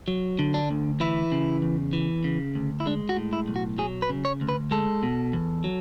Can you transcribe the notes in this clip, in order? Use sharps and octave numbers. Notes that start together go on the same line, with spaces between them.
F#3
D3
D4
D2
E3 E4
C#3
E2
E3
C#3
D2
E4
G#3 D4
F#4
A2
E4
B1
F#4
F#3 G#4
B4
C#3
C#5
D2
B4
G#3 A4
B2
E2
F#3